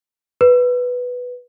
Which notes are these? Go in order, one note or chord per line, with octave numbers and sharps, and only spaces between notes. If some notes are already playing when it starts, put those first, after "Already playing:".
B4